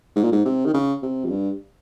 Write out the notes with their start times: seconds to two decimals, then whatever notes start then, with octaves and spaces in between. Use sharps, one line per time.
0.16 G#2
0.24 A#2
0.32 G#2
0.45 C3
0.66 D#3
0.74 C#3
1.03 C3
1.25 F2
1.30 G2